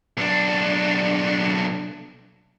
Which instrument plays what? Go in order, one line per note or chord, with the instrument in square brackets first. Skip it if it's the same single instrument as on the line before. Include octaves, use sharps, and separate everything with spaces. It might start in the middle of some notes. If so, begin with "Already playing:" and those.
[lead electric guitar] B1 D4